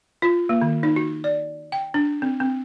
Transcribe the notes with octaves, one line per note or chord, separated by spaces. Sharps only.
F4
A#3
D#3
D#4
F#4
D5
G5
D4
C4
C4